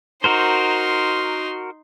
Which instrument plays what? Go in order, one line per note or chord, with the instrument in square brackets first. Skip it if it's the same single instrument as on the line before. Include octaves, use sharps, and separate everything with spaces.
[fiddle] D#4 C6 [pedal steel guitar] F#4 A#4 C5